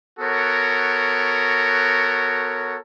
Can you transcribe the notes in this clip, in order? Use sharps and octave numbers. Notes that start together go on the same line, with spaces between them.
B3 F#4 A4 A#4 C#5